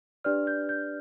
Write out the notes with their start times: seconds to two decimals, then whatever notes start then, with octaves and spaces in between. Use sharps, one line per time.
0.24 D4 G4 B4 D5 F6
0.47 G6
0.69 G6